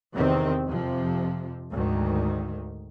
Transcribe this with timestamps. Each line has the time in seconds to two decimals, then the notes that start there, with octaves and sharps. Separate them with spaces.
0.14 E2 C3 D#3 C4
0.66 F2 C3 F3
1.72 D2 G#2 D#3